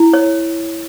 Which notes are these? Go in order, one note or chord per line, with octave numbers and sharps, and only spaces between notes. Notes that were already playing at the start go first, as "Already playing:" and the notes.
Already playing: E4
C#5